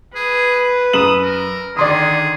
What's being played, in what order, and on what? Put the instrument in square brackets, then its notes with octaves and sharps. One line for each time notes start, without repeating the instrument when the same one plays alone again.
[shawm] G#4 [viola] B4
[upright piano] F#2 E7 F#7 [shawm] D#6
[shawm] A#4
[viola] D3 D#3 [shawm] G#4 [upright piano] D5 C6 D#6